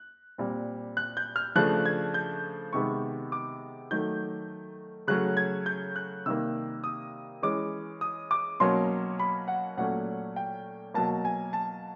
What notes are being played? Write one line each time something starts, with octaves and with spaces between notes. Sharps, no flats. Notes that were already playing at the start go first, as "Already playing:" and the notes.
Already playing: F#6
A#2 G3 C4
F#6
G6
F6
C#3 F3 A3 D4 F#6
G#6
G6
C3 D#3 G#3 B3 C#6
D6
D#3 F#3 A3 G6
C#3 F#3 A3 C#4 F#6
G#6
G6
F#6
C3 D#3 G3 A#3 E6
D#6
E3 G#3 C#4 D6
D#6
D6
B2 F#3 A#3 C#4 C6
B5
F#5
A#2 F#3 A3 C#4 F#5
G5
B2 F#3 A#3 A5
G#5
A5